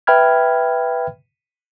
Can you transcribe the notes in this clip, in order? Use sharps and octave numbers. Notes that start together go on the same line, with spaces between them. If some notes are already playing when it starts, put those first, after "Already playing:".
B4 E5 G5 B5 F6 G#6